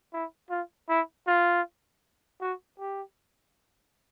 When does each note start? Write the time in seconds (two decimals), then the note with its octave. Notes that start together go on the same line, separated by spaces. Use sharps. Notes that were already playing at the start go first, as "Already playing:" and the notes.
0.13 E4
0.50 F4
0.89 E4
1.27 F4
2.41 F#4
2.79 G4